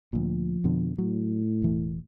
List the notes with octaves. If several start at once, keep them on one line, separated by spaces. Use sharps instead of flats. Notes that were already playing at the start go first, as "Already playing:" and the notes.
D2 A#2 F3
F2 B2 D3
A2 F#3
E1 E3 A3